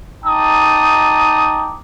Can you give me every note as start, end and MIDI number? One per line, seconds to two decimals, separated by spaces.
0.25 1.77 63
0.25 1.77 79
0.25 1.77 81
0.25 1.77 82
0.25 1.77 86
0.25 1.77 87